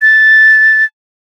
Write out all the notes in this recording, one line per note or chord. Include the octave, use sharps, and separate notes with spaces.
A6